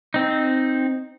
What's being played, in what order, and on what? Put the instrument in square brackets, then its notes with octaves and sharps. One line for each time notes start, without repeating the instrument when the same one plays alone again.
[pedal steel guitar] C4 D#4